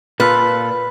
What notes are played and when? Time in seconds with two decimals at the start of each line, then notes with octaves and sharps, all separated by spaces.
0.20 A#2 F4 A4 B4